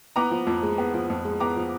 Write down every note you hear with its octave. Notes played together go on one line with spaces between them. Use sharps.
B3 A#5 D6
F3
F2
G#3
B3
F3
F2
G#3
B3 A#5 D6
F3